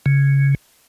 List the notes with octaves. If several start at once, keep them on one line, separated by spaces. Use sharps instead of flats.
C#3